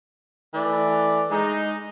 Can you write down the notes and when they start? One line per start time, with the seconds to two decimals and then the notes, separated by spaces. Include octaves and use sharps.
0.54 E3 A3 D5
1.31 G#3 D#4